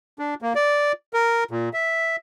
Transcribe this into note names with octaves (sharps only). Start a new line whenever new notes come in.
D4
A#3
D5
A#4
A#2
E5